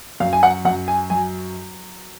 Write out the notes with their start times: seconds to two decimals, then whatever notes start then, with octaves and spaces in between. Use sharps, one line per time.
0.20 F#2 F5
0.33 G#5
0.43 F#5
0.65 F#2 F#5
0.88 G#5
1.10 F#3 G#5